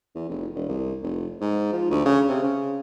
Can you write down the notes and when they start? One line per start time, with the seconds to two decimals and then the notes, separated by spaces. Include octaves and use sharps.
0.15 E2
0.29 F1
0.55 E1
0.68 C2
1.02 F1
1.41 G#2
1.73 F3
1.90 D2
2.05 C#3
2.29 C3
2.43 C#3